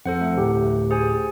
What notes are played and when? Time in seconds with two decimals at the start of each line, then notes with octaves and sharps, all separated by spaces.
0.06 F2 A4 C5 F#5
0.21 A3
0.36 D2 A2 G4
0.91 G#4 C5 G#5